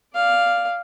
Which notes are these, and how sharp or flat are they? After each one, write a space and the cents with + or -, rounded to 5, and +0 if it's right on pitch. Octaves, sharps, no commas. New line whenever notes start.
D5 +0 F5 +0